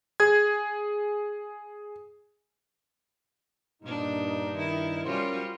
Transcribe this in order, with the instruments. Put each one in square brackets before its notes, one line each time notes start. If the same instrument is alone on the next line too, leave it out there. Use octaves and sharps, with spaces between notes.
[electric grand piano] G#4 G#6
[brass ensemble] G2 D#4 [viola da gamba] A#2 D4
[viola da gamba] D#3 E4
[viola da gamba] G3 F4 F#4 [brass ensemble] C#4 A#4 C5